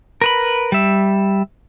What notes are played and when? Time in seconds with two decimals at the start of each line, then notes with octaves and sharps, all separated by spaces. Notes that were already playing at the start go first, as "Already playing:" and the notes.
0.21 A#4 B4 B5
0.72 G3 E5